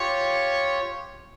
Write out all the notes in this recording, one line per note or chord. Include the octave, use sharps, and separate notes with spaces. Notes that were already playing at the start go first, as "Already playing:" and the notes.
Already playing: F4 G4 C#5